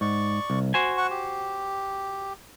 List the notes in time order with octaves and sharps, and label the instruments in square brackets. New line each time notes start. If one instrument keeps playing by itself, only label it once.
[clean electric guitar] G#2 [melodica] D5 C#6
[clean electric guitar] C2
F#4 C5 G#5
[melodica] F#5 C#6
G4